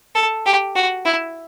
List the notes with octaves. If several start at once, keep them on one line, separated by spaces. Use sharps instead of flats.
A4
G4
F#4
E4